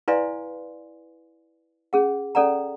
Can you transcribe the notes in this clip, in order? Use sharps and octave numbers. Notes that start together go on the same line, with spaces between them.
E4 B4 D5 F5 G#5 C6
C#4 G#4 F#5
C#4 A4 D5 F#5 A#5